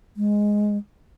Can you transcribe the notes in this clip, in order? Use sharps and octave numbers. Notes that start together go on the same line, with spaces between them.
G#3